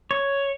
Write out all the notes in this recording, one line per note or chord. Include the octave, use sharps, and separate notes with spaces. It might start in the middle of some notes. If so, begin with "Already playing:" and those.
C#5